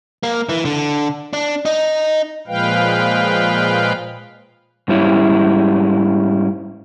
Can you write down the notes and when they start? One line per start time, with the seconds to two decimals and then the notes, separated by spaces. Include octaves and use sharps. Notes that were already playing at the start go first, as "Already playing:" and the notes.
0.23 A#3
0.49 E3
0.65 D3
1.33 D4
1.65 D#4
2.47 A#2 F3 G#3 B4 F5 G5
4.88 G#2 G3 C#4 E4